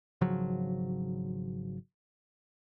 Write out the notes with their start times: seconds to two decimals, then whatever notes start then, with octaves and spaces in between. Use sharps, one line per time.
0.21 G#1 C#3 F3 F#3